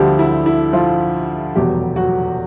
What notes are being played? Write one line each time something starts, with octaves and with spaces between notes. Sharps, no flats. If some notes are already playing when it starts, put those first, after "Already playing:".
Already playing: D2 D3 F3 G3 G4
E4
E4
F3 F4
F1 E2 B2 F#3 G3 G4
F#3 F#4